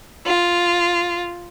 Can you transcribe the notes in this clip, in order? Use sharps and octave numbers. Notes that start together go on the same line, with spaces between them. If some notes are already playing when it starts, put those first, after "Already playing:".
F4